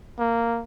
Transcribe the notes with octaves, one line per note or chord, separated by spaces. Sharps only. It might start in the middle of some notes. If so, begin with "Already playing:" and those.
A#3